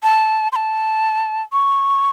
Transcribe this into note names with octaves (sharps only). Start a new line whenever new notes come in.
A5
C6
A5
C#6